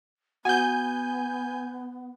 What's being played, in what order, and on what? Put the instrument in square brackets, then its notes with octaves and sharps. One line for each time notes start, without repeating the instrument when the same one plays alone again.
[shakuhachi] B3 [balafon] F#4 F#5 [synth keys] G#5 G6